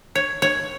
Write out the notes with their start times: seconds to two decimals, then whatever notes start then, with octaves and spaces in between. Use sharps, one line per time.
0.15 C#5
0.42 C#5